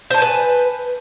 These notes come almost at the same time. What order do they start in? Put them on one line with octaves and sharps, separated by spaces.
C5 A5 G#5 B4